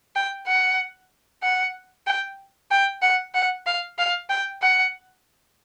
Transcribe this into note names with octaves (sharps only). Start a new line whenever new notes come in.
G5
F#5
F#5
G5
G5
F#5
F#5
F5
F5
G5
F#5